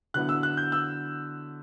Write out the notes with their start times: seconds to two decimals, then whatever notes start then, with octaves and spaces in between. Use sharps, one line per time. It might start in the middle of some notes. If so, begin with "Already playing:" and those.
0.14 D3 F#3 B3 E4 F#6
0.29 E6
0.43 F#6
0.57 G6
0.72 E6